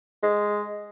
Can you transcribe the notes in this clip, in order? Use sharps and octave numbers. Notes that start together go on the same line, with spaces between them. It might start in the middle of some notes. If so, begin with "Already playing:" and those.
G#3